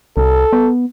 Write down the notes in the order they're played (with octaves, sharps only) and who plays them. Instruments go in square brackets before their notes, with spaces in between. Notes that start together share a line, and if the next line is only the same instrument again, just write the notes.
[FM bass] C2 [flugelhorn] A4
[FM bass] B3